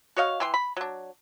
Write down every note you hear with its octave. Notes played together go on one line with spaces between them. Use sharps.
F#4 C#5 D#5 F5
E3 G5 C6
B5
F#3 D4